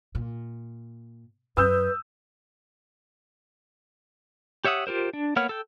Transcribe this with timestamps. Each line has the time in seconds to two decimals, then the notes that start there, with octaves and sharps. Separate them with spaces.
0.15 A#2
1.57 F#2 B4 D#6 E6 G6
4.65 G4 C#5 E5 F#5 D#6
4.87 F4 G4 A#4 C5
5.13 D4
5.36 A#3 B3 C#5 F#5 F6
5.49 A4 G5